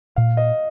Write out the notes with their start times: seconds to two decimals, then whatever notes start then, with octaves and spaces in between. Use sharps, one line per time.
0.16 A#2 F5
0.37 D#5